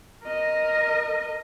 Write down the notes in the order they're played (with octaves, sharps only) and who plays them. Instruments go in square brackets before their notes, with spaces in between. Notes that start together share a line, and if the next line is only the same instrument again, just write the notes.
[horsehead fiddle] A#4 D#5